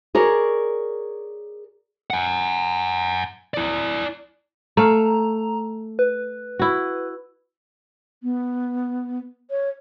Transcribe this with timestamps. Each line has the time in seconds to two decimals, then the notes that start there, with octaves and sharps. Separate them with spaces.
0.15 G#4 A#4 C#5 D5
2.10 F#5 G#5
3.54 E4 D5
4.77 A3 F5 A#5
5.99 B4
6.59 E4 F#4
8.23 B3
9.50 C#5